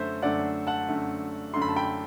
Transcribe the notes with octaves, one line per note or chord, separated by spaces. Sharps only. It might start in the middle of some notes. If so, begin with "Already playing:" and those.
Already playing: F#2 D3 A3 C5 E5
F#2 D3 A3 D5 F#5
F#5 A5
F#2 D3 A3
F#2 D3 A3 C6
B5
A5
G5 B5